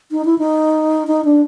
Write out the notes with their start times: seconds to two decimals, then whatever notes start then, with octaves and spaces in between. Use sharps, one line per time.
0.12 D#4
0.25 E4
0.38 D#4
1.07 D#4
1.25 D4